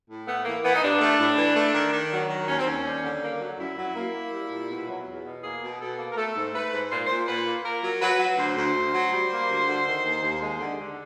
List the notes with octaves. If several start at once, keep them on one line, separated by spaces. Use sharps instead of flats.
A2
A3 B3
E3 A#3
E3 B3
D#4
G2 D4
A3
A2
E3
A3
D#3
D#3
F#3
D#3
D#2 C#4
C4
D#2 C#4
G3
D3
A#3
F#3
F#2 E4
F#3
A#3
A#3
G3
A#2
B2
F#3
E2
B2
A#3 G#4
B2
B2 A4
A#3
A#4
A3 A4
G#2
A3 B4
G#2
A#2 C5
A#2 C5
A#2 B4
A#3
A#3 A#4
F#3
F#3 B4
F#3
D2 C5
D2
D2
F#3
G3
A#3
D2
D3
D#3
D#2
D#2
G#3
D3
D3